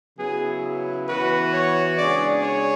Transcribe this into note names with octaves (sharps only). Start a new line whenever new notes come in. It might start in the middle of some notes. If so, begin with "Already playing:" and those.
C#3 F#3 B3 E4 G#4
E3 B3 F#4 B4
C#5
C#3 G#3 D4 G#4 D5
C#5